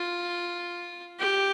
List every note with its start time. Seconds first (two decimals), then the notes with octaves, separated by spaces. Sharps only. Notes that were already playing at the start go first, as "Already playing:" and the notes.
Already playing: F4
1.19 G4